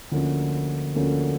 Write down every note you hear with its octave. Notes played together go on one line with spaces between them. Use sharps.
D2 D3 F3 A#3 C#4
D2 D3 F3 A#3 C#4